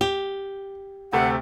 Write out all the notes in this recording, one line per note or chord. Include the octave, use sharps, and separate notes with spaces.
G4 G7
D2 C3 A3 F#5